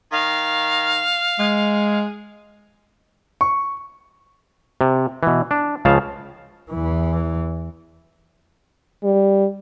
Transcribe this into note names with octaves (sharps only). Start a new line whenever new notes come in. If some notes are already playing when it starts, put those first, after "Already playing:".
D#3 F5
G#3 G#4
C#6
C3
B2 E3
D4
C#2 C#3 F3 F5 A5
E2 E3
G3